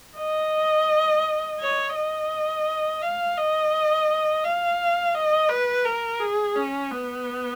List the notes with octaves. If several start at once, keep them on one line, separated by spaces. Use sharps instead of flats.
D#5
C#5
D#5
F5
D#5
F5
D#5
B4
A#4
G#4
C#4
B3